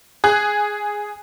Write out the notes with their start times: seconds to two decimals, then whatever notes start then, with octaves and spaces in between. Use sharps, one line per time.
0.24 G#4 F#6